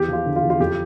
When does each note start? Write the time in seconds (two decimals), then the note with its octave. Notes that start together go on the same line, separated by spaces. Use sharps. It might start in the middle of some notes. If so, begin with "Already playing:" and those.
Already playing: E2 G4
0.08 F3 F4
0.26 D3
0.36 F4
0.42 E2
0.50 F4
0.60 F2 G4